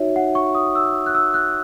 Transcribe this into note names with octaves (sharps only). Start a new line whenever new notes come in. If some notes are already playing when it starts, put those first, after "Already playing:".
Already playing: D#4 F#4 C#5 E5
F#5
C#6
D#6
E6
F#6
E6
F#6